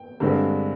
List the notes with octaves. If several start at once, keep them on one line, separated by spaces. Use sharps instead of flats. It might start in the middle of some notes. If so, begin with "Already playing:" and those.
Already playing: G5
G2 D3 G#3 C4